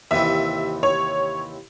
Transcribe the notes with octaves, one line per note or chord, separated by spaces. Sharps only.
D#2 C3 E3 E5
C#5